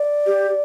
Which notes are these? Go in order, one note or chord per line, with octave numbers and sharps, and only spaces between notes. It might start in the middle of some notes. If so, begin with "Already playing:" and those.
Already playing: D5
G4